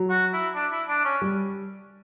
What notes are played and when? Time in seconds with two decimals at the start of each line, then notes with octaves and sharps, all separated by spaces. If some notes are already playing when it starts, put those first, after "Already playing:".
Already playing: F#3
0.10 F#4
0.33 E4
0.55 D4
0.72 E4
0.89 D4
1.05 C#4
1.22 G3